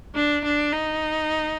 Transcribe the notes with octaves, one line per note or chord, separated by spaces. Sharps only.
D4
D4
D#4